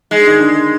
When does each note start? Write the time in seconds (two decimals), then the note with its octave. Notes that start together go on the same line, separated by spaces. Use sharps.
0.11 G#3 D#4
0.19 D4
0.27 D#3 D#4
0.39 D3 D4